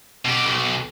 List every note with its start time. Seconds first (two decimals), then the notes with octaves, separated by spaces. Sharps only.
0.25 B2 G4
0.45 B1